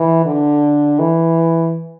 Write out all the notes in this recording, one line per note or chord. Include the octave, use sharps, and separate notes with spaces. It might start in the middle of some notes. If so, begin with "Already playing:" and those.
Already playing: E3
D3
E3